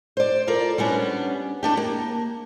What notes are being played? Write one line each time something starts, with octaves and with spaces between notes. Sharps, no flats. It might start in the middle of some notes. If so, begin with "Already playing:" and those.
C5 D5
F4 A4 A#4 D5
G3 B3 C#4 D4
A3 D4 G4
A#3